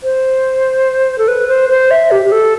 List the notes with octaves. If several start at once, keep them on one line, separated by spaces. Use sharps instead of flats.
C5
A4
B4
C5
C5
E5
G4
G4
A4